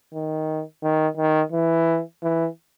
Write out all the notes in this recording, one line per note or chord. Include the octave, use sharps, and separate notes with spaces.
D#3
D#3
D#3
E3
E3